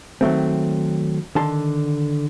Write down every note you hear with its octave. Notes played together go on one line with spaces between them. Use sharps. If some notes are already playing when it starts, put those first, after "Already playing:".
D#3 F#3 A3 C4
D3 D#3 A5 C6